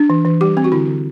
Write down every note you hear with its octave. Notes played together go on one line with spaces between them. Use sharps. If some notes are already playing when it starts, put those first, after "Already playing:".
Already playing: D4
E3
E3
G3 G4
C4
F#4
D3 E4
D3